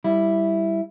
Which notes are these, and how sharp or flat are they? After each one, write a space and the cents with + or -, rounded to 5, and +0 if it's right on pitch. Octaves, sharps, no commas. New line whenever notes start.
G3 +0 E4 +0